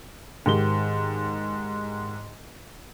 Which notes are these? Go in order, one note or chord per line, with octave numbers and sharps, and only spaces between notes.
G#2 D#3 G4 G7